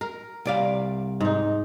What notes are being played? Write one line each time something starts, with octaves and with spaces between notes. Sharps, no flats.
A#4
C2 D5 F5
G#2 D#4